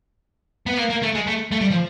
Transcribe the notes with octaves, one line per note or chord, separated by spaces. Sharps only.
B3
A#3
A#3
A3
G#3
A3
A3
G3
F3